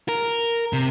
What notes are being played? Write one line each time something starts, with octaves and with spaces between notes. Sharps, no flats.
A#4
C3